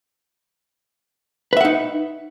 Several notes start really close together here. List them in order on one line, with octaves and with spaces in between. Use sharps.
B4 E5 F#5 D#4